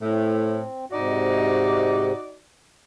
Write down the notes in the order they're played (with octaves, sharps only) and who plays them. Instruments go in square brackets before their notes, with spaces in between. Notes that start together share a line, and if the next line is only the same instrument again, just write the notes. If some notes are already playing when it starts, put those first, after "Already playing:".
[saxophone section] A2 [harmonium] C4
[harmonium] G#2 C3 [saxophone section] D#4 F#4 D5